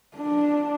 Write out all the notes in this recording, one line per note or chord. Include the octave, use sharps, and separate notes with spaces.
D4